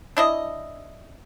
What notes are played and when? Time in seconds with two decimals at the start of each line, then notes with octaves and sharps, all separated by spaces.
0.17 D4 E4 D#5